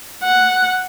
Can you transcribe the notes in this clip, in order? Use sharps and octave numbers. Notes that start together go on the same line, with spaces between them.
F#5